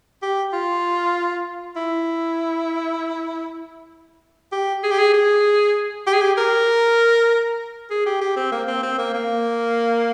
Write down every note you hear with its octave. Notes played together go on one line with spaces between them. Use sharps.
G4
F4
E4
G4
G#4
G4
G#4
G#4
G4
G#4
G4
A#4
G#4
G4
G4
C4
A#3
C4
C4
A#3
A#3